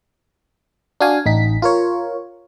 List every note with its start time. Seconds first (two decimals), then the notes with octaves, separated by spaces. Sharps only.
1.01 D4 F#4 F5 G#5
1.26 A1 D#4 B6
1.62 F4 A#4 C#5